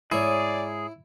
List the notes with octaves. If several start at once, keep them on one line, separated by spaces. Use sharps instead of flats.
G#2 E4 G#4 C#5 D5